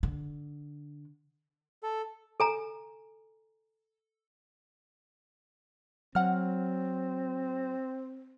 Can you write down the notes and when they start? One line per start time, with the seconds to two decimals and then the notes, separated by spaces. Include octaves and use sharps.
0.03 D3
1.83 A4
2.40 A4 G#5 A#5
6.15 F#3 C4 F#5 F6